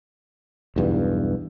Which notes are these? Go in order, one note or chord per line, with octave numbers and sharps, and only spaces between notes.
B1 E2 G2